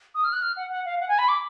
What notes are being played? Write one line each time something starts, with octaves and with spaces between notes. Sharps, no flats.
D#6
F6
F#6
F6
F#5
F#5
F5
F#5
G#5
B5
D6